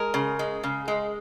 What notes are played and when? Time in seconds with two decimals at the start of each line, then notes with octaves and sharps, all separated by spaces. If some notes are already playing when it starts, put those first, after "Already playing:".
Already playing: G#3 A#4
0.14 C#3
0.39 G#3
0.64 C#3
0.88 G#3